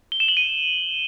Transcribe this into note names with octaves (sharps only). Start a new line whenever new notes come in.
G7
E7
F#7
D#7